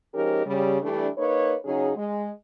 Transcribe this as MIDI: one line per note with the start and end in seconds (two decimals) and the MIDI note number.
0.15 0.45 53
0.15 0.45 56
0.15 0.45 61
0.15 0.45 63
0.15 0.45 67
0.15 0.45 70
0.46 0.78 49
0.46 0.78 55
0.82 1.08 52
0.82 1.08 55
0.82 1.08 57
0.82 1.08 62
1.18 1.54 58
1.18 1.54 63
1.18 1.54 71
1.18 1.54 73
1.65 1.91 49
1.65 1.91 54
1.65 1.91 61
1.65 1.91 63
1.65 1.91 68
1.97 2.30 56